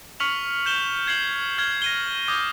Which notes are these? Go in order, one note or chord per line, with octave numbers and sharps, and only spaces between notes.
C#6 F6 B6 C#7 F7 F#7
G6 E7 G7
G#6 C7 E7 F#7
F6 G#6 G7
A#6 D#7 G7
D6 D#6 G6 G#6 A#6